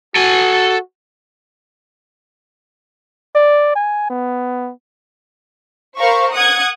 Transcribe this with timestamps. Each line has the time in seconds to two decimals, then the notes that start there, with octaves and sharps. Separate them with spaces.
0.16 F#4 A4 G#5
3.35 D5
3.75 G#5
4.10 B3
5.97 A#4 C5 F5 B5 C#6
6.33 F#5 D#6 F#6 G#6